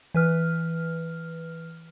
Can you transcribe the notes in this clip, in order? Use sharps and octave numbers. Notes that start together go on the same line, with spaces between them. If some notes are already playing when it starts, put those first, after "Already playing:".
E3 B4 F6